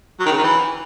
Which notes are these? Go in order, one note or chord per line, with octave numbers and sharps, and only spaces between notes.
F#3
D#3
C#3
D#3
E3